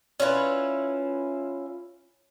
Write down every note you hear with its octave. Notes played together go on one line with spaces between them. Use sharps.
C#4 E4 F4 B4